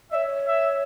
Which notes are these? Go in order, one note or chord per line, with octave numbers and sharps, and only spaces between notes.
C#5 D#5 E5
E5